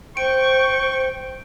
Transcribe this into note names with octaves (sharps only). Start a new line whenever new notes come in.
C5 G5 C#6 D7